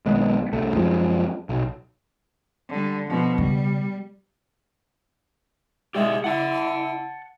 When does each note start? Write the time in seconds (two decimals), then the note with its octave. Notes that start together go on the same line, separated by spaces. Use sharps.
0.06 B1 D#3 G#3 B3
0.53 C2 A3
0.74 F#2 F3 G#3
1.49 B1
2.69 D3 G3
3.07 B2 F3
3.38 C#3 G3
5.95 G#3 G4 D5 E5
6.24 E4 F#5 A5